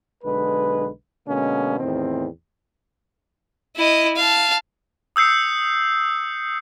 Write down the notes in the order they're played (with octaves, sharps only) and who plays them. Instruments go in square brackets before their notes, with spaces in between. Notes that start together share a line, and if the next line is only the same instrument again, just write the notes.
[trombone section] B1 D3 G#3 B4
B2 D3 G#3 A#3 C#4
E2 A2 D#3 C4
[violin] E4 D#5
F5 A5
[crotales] D#6 E6 G6 C7 C#7